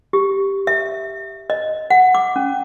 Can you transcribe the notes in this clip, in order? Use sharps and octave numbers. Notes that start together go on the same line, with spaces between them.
G4
E5
D#5
F#5
D6
C#4